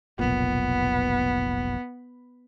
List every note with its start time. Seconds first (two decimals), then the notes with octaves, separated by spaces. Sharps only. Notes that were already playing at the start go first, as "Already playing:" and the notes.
0.19 F1 B1 A#2 B3